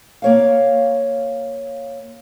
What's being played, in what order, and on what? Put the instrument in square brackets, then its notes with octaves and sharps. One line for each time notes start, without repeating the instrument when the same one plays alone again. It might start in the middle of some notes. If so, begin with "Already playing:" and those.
[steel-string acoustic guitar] A#3 C#5 F5